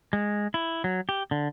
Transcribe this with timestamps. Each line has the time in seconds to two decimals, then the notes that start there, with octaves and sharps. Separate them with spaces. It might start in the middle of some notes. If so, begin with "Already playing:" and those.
0.13 G#3
0.54 E4
0.84 F#3
1.09 G4
1.31 D3